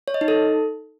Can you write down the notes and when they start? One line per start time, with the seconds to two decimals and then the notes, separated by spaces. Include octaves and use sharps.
0.08 C#5
0.14 D#5
0.21 D#4
0.28 A4